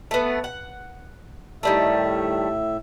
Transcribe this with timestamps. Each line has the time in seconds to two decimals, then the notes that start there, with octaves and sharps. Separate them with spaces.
0.11 A3 B3
0.44 F#5
1.63 A2 D#3 G3 A3 E5